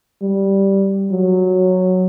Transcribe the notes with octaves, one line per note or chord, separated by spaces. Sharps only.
G3
F#3